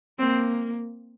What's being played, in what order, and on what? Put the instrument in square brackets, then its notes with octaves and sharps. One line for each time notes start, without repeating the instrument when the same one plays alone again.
[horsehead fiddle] A#3 [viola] C4